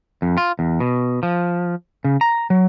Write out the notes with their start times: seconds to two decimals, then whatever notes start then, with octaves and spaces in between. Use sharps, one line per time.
0.22 F2
0.38 F4
0.59 E2
0.80 B2
1.23 F3
2.05 C#3
2.21 A#5
2.50 F#3